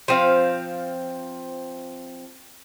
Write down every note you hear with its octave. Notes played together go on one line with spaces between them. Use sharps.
F3 C4 F5